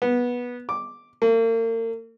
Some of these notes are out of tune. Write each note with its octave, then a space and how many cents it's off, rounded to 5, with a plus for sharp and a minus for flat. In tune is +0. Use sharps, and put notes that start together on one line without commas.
B3 -15
D6 +0
A#3 -40